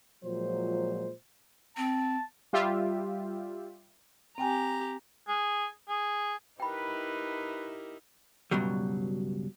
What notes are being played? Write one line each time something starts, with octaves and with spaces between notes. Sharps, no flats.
A#2 F3 F#3 G#3 C5
C4 A5
G3 F4 G4 E5
C4 G4 G5 G#5 A#5
G#4
G#4
D#4 E4 G4 A#4 B4 G5 B5
C#2 G2 B2 F#3 G3